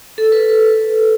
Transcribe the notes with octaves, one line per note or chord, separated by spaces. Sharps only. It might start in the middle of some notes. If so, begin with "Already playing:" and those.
A4
B4